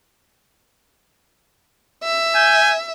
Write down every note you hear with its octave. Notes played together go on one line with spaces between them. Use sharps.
E5
G#5 G6